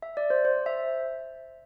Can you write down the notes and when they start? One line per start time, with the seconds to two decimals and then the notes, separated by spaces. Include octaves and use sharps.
0.02 E5
0.17 D5
0.30 C5
0.45 C5
0.66 E5